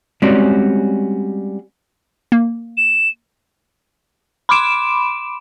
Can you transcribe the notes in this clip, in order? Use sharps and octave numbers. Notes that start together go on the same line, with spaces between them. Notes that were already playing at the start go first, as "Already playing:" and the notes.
G3 G#3 C4 C#4 F#4 D5
A#3
E7
B5 C6 D6 D7 E7